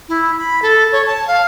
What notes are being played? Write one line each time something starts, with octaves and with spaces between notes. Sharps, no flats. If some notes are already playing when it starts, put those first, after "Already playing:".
E4
B5
A4
C#5
A5
F5